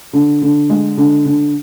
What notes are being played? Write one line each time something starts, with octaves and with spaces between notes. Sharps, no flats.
D3
D3
G#3
D3
D3